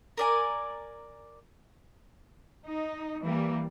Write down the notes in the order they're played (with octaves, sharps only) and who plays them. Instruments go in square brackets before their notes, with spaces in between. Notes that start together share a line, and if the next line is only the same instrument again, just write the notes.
[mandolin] A#4 D5 G#5
[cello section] D#4
E3 G3 A#3